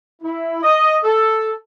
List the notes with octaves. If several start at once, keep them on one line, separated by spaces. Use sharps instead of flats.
E4
D#5
A4